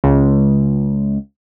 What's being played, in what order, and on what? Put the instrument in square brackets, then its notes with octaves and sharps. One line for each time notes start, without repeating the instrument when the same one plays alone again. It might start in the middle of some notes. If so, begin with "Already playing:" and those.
[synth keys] C#2